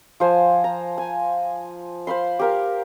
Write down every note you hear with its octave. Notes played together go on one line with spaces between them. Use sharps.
F3 C5 G#5
A#5
G#5
C5 F5 B5 C6
G4 A#4 F5